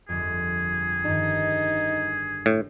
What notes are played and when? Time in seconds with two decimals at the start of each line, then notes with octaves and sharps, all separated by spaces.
0.09 G1 F2 G#4
1.05 G2 D#3 D#4
2.46 A2